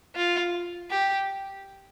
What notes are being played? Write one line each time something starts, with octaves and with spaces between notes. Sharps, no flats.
F4
G4